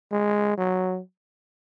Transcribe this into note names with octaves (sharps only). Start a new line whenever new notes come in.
G#3
F#3